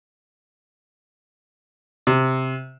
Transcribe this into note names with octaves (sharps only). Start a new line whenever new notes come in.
C3